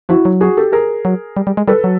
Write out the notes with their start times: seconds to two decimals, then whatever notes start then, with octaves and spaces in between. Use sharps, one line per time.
0.09 F3 E4 F#4
0.25 F#3
0.40 F#4 G#4
0.57 G4 A4
0.72 G#4 A#4
1.05 F#3
1.37 G3
1.47 G3
1.57 G#3
1.68 G3 A4 B4
1.84 F#3